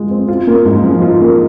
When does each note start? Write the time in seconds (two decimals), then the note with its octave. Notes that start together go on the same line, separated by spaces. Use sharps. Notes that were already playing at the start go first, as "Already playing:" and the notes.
Already playing: G#3 F4
0.11 C4
0.28 F4
0.47 A#3
0.65 G#2
0.84 F3
1.02 F4
1.21 A#3